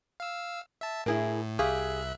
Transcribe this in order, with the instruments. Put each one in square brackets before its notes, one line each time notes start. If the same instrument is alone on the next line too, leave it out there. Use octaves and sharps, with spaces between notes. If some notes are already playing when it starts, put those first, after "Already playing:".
[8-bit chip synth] F5 E6
E5 A5
[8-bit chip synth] A2 [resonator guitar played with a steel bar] E4 G#4 A#4
[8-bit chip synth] C2 E5 F#6 [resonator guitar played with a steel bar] G4 G#4 F5